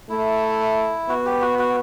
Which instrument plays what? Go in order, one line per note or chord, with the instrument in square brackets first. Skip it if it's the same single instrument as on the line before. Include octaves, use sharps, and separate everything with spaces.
[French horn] A3 [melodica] E4
[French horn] B3 [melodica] F#4
[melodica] G4
F#4
F#4